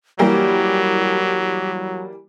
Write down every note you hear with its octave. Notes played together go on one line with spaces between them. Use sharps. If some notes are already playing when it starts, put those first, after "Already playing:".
E3 F#3 G3 A#3 G4